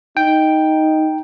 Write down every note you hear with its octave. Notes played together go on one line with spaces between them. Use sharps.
D#4 G5